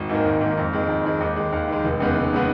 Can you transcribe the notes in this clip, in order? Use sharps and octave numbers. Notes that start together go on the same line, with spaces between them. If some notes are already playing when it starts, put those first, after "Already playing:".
Already playing: G#1
G#2 D#3 A#3
G#1
G#2 D#3 A#3
F2
D#3 G#3
F2
D#3 G#3
D#2
D#3 G#3
D#2
D#3 G#3
F1
D#2 C#3 G#3 B3
F1
C#3 G#3 B3